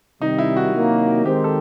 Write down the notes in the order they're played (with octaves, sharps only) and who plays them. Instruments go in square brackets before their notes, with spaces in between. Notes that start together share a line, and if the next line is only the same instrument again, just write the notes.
[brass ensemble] C3 D#3 G3 [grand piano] D#4
[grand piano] E4
F#4
[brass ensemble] C3 D#3 F#3 A#3 D#4
[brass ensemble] D#3 G#3 C4 [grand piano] G4
[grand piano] A4